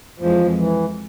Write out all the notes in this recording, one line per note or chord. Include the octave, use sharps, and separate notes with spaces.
F2 E3 F3 G#3
E3